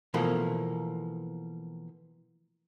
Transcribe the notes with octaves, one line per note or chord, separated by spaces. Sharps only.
B2 E3 F3 A3 A#3